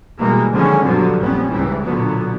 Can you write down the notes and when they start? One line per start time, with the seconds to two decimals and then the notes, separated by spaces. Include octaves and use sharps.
0.19 B2 E3 G3 G#3 A#3
0.51 D3 D#3 F3 G#3 C#4
0.81 G2 B2 D3 F3 F#3
1.21 A#1 F2 G3 B3 C#4
1.49 C#2 G#2 E3 G3
1.83 B1 A#2 D3 F#3 B3